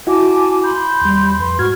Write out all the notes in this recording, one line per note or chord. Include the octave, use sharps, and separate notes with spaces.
E4 F#4 G#5 A5 D6
B5 C6 G6
D#2 G3
F2 B4 C6
G#2 F#4 C#6 F6 G#6